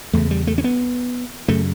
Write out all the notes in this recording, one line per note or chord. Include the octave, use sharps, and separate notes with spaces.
E2 C#3 A3
G3
A3
C#4
B3
F#2 C#3 A3